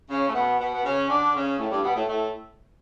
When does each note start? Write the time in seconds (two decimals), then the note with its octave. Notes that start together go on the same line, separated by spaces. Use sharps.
0.10 C#3 C#4
0.28 A3
0.34 B2 B3
0.59 B2 B3
0.73 B3
0.84 C#3 C#4
1.09 D3 D4
1.34 C#3 C#4
1.59 A2 A3
1.71 G2 G3
1.83 B2 B3
1.95 A2 A3
2.08 A2 A3